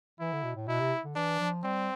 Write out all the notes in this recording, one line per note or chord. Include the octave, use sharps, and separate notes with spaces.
E3 E4
D3
B2
A2
B2 E4
C3
D3
E3 D4
F3
G3 C4